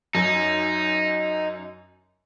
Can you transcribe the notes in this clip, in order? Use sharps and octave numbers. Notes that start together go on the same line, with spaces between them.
F#2 D#4